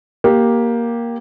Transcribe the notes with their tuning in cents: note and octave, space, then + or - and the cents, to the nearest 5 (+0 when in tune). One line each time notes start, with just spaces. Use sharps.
A#3 +10 G4 +0